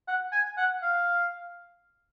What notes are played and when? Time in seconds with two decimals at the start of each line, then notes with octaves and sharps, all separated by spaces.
0.08 F#5
0.32 G#5
0.57 F#5
0.82 F5